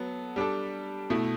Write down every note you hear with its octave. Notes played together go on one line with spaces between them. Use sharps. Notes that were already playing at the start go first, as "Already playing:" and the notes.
Already playing: F#3 B3 A4
G3 D4 A4
B2 A3 E4